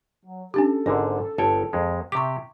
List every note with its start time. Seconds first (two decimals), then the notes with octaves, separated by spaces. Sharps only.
0.25 F#3
0.54 C#4 D4 G4 A4
0.86 G#1 G#2 D3 D5
1.38 G1 C#5 G5 A5
1.73 F2 G#3
2.12 C3 G4 E5 C#6 D6